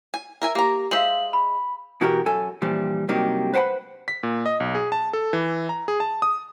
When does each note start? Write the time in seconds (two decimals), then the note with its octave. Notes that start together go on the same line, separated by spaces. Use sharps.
0.14 G#5
0.42 A#4 E5 G#5
0.55 A#3 G4 A#5
0.91 G#3 C5 E5 F5 F#7
1.33 B5
2.01 B2 E3 F#4 G4 A#4
2.26 F#2 A4 G#5
2.62 G2 A#2 E3 F3 G3
3.09 G2 C3 F#3 A#3 D#4 G4
3.54 B4 C5 F#5 G5 B5
4.08 B6
4.23 A#2
4.46 D#5
4.60 B1
4.75 G#4
4.92 A5
5.13 A4
5.33 E3
5.69 A#5
5.88 G#4
6.00 A5
6.22 D#6